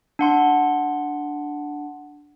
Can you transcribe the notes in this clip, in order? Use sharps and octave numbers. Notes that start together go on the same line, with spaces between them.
D4 F#5 C6